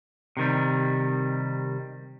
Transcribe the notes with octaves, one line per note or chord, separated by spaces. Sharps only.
C3 D#3 G3